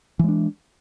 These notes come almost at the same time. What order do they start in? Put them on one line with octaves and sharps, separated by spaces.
E3 G#3 D4